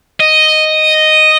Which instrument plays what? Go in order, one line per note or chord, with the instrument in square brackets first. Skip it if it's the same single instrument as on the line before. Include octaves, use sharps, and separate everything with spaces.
[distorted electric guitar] D#5